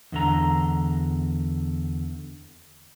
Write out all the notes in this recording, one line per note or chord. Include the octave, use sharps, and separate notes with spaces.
E2 D3 A#5